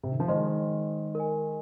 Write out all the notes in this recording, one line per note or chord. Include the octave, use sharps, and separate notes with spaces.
C3
D#3
F3
D#3 G#3 D#4 C5 D#5 C6
A#4 D#5 G#5